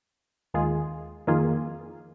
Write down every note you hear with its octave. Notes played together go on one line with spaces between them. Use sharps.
D#2 D#3 G#3 F4 G#4
F2 D#3 A#3 F4 G#4